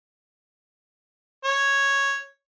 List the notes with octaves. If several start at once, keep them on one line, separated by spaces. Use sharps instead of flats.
C#5